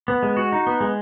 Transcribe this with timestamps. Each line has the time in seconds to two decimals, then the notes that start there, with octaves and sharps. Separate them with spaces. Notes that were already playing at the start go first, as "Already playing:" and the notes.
0.08 B3
0.23 G#3
0.37 F#4
0.52 D#4
0.67 B3
0.81 G#3